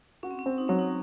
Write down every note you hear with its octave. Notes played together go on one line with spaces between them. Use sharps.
C#4 F#4
C4
C#4
C4
D#4
F#3 C#4
D#4